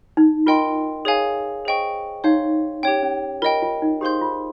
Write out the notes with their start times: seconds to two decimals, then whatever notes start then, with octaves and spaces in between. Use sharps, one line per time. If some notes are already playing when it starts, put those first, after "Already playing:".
0.17 D#4
0.46 F4 A#4 D#5 G5 C6
1.05 G#4 C#5 F5 G#5
1.65 G#4 C5 D#5 G5 C#6
2.24 D#4 C#5 F5 C6 G6
2.83 C#4 G4 C#5 G5
3.03 C#4
3.42 F4 A#4 D#5 G5
3.62 F4
3.82 D#4
4.01 G4 G#4 C5 F5 C6 G6
4.21 F4